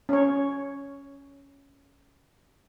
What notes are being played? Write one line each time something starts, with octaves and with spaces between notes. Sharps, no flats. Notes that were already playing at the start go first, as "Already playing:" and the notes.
C#4 C#5